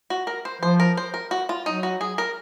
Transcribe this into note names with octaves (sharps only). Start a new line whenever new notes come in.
F#4
A#4
C5
F3 C5
A#4
C5
A#4
F#4
F4
F#3 D#4
F#4
G#4
A#4